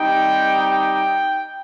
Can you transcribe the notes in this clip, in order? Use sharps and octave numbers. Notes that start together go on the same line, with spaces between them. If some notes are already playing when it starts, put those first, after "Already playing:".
Already playing: G3 C4 D#4 G4 G5
G5